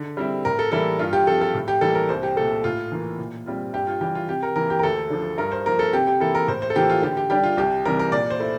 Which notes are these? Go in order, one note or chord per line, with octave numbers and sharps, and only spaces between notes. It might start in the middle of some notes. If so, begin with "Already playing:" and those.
Already playing: D3
G3 C4 E4
A2 A#4
A4
E3 G3 A#3 E4 A4
G2 F4
G4
F3 C4 A4
A4
A2
G4
E3 G3 A#3 A4
A#4
C2 C5
G4
A#2 A3 A4
A2 F4
E3 A#3 F4
A#2
G3 C4 F4
G2 G4
F4
E3 G3 G4
F4
C3 G4
A#4
E3 A#3 A#4
G4
A#4
D2 A4
D3 F3
G2 A#4
C5
F3 A#3 A#4
A4
C3 G4
G4
E3 A#3 E4 A4
A#4
A2 C5
C5
A4
E3 A#3 F4 G4
F4
D3 G4
G4
G3 D4 G4
F4
C2 G4
C3 E3 G3 A#4
A#4
A#2 D5
C5
A3 E4